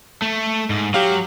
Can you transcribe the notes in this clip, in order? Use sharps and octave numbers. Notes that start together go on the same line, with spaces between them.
A3
G#2
F#3 G4 F5